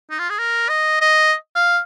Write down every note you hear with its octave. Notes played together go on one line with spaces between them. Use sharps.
D#4
F4
G#4
A#4
D#5
D#5
F5